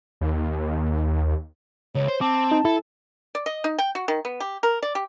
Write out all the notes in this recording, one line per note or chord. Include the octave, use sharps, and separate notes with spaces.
D#2
C#2 C#5
C5
C4 A5 D6
D#4
E4 A4
D5
D#5
D#4
G5
F#4
D#3
B3
G4
A#4
D5
G4